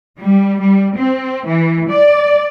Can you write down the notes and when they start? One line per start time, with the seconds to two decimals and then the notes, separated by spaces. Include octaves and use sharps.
0.19 G3
0.59 G3
0.97 C4
1.45 E3
1.90 D5